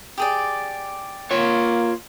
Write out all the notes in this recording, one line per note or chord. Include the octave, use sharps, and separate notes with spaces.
G4 G#4 D5
A#3 F4 C#5